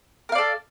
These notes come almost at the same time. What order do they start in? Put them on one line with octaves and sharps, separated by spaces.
A#4 F5 D5 A4